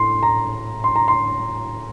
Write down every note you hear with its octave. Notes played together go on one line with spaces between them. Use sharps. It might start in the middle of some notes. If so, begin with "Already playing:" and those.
Already playing: A2 C6
A#5
C6
A#5
C6